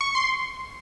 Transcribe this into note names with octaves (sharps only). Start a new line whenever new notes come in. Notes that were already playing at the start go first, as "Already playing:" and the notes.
C#6
C6